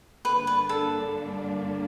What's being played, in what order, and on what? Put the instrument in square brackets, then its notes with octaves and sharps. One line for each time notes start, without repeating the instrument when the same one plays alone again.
[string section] G2 D3 G3 A#3 D4 [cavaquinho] B4
[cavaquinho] B4
A4